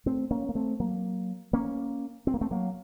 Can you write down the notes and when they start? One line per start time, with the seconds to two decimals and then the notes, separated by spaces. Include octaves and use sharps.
0.06 A3 C4
0.31 A#3 C#4
0.49 A#3
0.55 A3 C4
0.80 F#3 A#3
1.53 A#3 C#4
2.27 C4
2.34 A#3
2.41 A3 C4
2.51 F#3 A#3